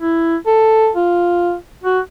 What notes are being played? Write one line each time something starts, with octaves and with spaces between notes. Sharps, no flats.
E4
A4
F4
F#4